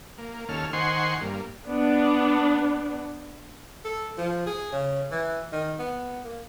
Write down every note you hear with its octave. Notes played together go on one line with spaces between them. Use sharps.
A#3
D#2 C#4 A4 F6
D#3 C5 F#5 G#5 C6 C#6
G2 A#3
B3 D4
A4
F3
G#4
C#3
E3
D#3
B3
A#3